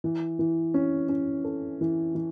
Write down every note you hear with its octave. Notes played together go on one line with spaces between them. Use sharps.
E3
E3
C#4
C#4
A4
E3
E3